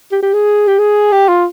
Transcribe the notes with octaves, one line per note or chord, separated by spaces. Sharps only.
G4
G4
G#4
G4
G#4
G4
F4